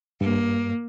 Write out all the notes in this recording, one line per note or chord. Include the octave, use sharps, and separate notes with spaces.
G2 A#3